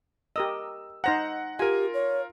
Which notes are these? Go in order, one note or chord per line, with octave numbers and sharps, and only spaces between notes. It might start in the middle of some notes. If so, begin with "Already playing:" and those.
G4 A#4 D#5 E6
D#4 C5 F#5 A#5 A#6
F4 G4 A#4 G#5
C#5